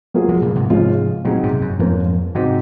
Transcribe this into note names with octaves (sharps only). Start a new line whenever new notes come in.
F#3 A#3 F4 G#4
F3 G#3
A#2 C#3
G#2 C3
G#2 C3 F3 G#3 C#4 F4
A#2 C#3 F#3 C4 D#4 G#4
G#2 C3
F#2
F2 G#2 F3 A#3 C#4
G#2 C3 G#3 C4 D#4 F#4